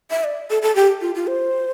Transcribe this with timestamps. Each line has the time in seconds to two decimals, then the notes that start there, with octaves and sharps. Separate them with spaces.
0.11 E5
0.24 D5
0.50 A4
0.62 A4
0.76 G4
1.01 F4
1.15 F4
1.27 C5